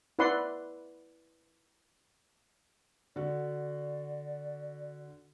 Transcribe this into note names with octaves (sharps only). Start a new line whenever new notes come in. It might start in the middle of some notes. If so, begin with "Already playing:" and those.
E4 B4 D5 F#5 C6
D3 F#4 D5